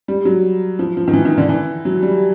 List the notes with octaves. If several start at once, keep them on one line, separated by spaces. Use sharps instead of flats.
G3
F#3
F3
F3
D#3
E3
D#3
D3
E3
F#3
G3